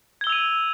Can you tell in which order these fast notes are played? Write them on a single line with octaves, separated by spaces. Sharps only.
G#6 G7 E6 F7 D#7